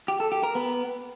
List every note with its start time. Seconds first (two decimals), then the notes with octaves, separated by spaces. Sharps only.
0.08 G4
0.20 A4
0.32 G4
0.43 A#4
0.55 B3